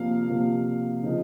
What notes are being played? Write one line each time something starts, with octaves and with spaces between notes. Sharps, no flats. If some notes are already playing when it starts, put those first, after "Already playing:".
Already playing: C3 F3 A#3 F5
C3 F3 A#3
C#3 F3 C4 D#4